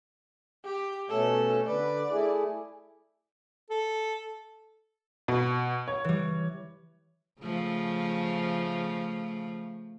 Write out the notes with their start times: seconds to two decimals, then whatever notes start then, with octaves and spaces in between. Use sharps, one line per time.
0.64 G4
1.10 B2 A3 C#4 A4
1.67 D3 B4 D5
2.11 A3 E4 G#4
3.70 A4
5.28 B2
5.88 C#5
6.04 E3 G3
7.42 C#3 F3 A3